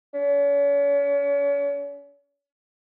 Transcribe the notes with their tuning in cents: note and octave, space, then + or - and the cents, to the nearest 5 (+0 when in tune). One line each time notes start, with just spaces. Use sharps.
C#4 +40